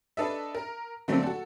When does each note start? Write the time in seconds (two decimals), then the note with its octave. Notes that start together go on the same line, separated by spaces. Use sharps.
0.17 D4 A4 B4 D#5 E5
0.55 A#4
1.08 D3 F#3 A3 A#3 C4 D4
1.23 F#4 A4